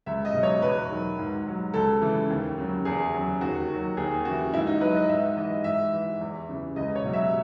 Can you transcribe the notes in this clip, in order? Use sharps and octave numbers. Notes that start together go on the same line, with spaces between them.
C#2 E5
D#5
B2 F#3
C#5
E2 B4
D#3 F#3
G#2
F#3
C#2 A4
C#3 E3
D#2
C#3 F#3
E2 G#4
C#3 F#3
D#2 F#4
D#3 F#3
D#2 G#4
C#3 E3 F#4
G#2 E4
D#4
F#3 B4
D#5
G#2 E5
E3 D#5
G#2 E5
E3
E2
C#3 E3
C#2 D#5
C#5
B2 F#3
E5